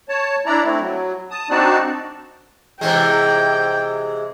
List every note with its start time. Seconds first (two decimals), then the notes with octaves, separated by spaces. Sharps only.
0.09 C#5 A5
0.46 D4 E4 D5 A#5
0.65 A3 C4 E4
0.80 F#3
1.31 A5 D#6
1.50 C4 D4 D#4 F#4 D5 A5
2.81 C3 E3 G#3 G5